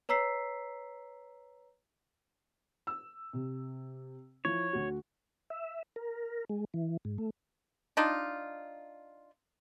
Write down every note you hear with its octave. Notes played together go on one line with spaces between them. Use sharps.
B4 C#5 A#5 E6 B6 C7
E6
C3
F3 E4 C#5
D2 F#4
E5
A#4
G#3
E3
G#2
A3
D4 D#4 F4